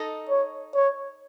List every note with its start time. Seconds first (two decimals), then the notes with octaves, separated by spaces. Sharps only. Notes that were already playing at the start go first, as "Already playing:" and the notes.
Already playing: D#4 A4 D#5
0.29 C#5
0.75 C#5